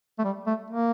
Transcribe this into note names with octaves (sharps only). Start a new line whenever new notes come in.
A3
G3
A3
A#3